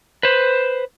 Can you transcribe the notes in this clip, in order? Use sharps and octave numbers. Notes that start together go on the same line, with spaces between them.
B4 C5